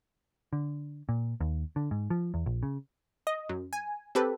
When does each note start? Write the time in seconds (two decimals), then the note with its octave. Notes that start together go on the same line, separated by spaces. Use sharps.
0.53 D3
1.09 A#2
1.41 D#2
1.76 D3
1.91 G#2
2.10 F3
2.34 E2
2.46 A#1
2.63 C#3
3.27 D#5
3.49 F#2
3.73 G#5
4.15 C4 G4 A4 B4